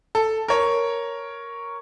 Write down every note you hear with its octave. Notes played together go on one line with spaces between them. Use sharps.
A4
A#4 C#5